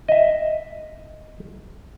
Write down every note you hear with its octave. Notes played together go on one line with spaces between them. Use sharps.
D#5 E5